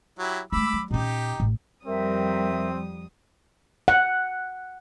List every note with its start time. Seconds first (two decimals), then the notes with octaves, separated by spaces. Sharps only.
0.19 F#3 E4 G4
0.52 G#3 A3 B5 D6 E6
0.73 F#3
0.91 A#2 C#4 D#4 G4
1.40 A1 A2
1.86 F2 G3 C4 A#4 E5 D#6
3.88 F#5